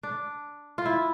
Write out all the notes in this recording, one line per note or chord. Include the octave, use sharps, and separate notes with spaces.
D4
F4
E4